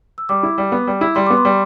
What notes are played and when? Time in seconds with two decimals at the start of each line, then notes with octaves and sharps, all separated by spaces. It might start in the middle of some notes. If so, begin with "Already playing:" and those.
0.18 E6
0.29 G3 D6
0.43 E4
0.58 G3
0.72 B3
0.87 G3
1.01 E4
1.15 G3 C6
1.26 B3 D6
1.37 C6
1.45 G3